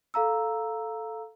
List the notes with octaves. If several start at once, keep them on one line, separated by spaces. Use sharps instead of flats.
A4 F5 A#5 E6